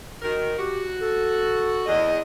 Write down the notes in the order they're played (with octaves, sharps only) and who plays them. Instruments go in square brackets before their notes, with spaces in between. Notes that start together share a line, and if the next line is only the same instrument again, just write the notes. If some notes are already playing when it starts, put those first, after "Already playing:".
[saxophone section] D#3 A#4 [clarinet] F#4
[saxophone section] F#4 [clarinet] G4
[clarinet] A4
[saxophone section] E2 [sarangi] D#5